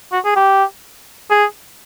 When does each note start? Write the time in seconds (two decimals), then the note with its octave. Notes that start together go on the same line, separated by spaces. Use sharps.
0.12 F#4
0.25 G#4
0.36 G4
1.30 G#4